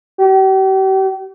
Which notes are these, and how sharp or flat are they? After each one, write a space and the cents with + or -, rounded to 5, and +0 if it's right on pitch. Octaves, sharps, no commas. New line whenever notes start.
G4 -40